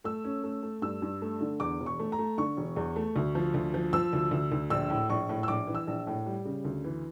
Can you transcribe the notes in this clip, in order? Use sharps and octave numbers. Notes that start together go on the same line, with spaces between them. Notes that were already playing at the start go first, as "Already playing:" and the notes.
A3 E6
C#4
A3
A3
G2 E6
G2
A3
D3
E2 D6
E1
C#6
A3
A#5
A3
D3 C#6
E1
E2
A3
D2
F3
D2
F3
F3 E6
D2
D2
D2
A#1 E6
A2
A#1 C#6
A2
E6
A#1 D6
E3
E6
A#1
A2
G3
C#3
D2
E3